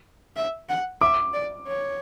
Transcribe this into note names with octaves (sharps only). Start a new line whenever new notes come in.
E5
F#5
E5 D6
D5
C#5